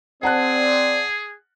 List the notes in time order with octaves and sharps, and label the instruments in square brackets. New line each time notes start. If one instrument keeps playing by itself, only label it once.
[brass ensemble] C4 D5 [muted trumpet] G#4 [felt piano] F#5 A5 F#6